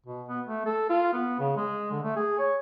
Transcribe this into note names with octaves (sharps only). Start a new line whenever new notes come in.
B2
B3
A3
A4
F4
B3
C#3
G#3
D3
A3
G#4
C#5